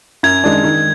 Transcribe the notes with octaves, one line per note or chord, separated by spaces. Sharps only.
F#2 G#6
D#3 G#3 D4
D#3